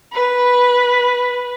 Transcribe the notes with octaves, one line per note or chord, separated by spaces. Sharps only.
B4